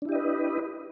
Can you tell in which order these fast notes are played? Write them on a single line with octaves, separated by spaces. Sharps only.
D4 E4 G4 D#5 B4